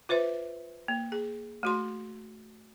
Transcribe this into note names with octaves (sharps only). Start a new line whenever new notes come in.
F4 B4 C5 E5
A#3
G#4
A3 F#4 C6